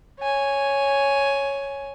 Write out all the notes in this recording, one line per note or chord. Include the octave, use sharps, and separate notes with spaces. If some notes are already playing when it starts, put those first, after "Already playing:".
C#5 G#5